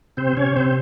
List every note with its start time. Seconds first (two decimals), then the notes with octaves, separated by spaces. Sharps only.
0.17 C3 C4 C5
0.37 C3 C#4 C#5
0.56 C3 C4 C5